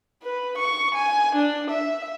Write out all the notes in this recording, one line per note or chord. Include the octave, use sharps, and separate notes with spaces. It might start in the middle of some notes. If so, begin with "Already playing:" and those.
B4
C#6
G#5
D4
E5